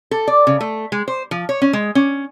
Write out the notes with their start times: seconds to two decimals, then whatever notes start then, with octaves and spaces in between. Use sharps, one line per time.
0.11 A4
0.28 D5
0.47 C#3
0.61 A3
0.92 G#3
1.08 C5
1.31 F3
1.49 C#5
1.62 C#4
1.73 G#3
1.95 C#4